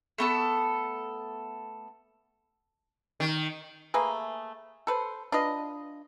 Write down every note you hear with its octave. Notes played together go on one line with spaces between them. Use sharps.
A3 B3 A4
D#3
A3 A#3 G#4 B4
A4 B4 C5
D4 F4 B4 D#5